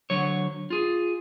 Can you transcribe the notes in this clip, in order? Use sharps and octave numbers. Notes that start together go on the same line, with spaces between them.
D3 F#3 C#5
F4 G#4